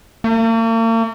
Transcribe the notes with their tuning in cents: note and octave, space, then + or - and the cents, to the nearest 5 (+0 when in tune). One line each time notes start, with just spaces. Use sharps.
A#3 -45